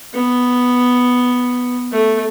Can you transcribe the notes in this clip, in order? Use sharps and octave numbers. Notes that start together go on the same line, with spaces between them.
B3
A3